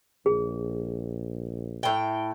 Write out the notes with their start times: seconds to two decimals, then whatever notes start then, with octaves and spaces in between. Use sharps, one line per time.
0.26 A#1 G#4
1.83 A2 G5